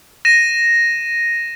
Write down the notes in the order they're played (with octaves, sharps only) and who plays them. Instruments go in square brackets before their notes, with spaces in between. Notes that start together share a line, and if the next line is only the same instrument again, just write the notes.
[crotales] A#6 D#7 E7